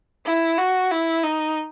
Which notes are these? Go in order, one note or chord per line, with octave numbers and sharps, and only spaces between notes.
E4
F#4
E4
D#4